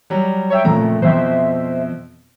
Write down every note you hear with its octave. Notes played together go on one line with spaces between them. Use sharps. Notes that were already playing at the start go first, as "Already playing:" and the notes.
F#3 G3
C#5 E5 G5
F2 A#2 C#3 A3 A#5
F2 B2 C5 E5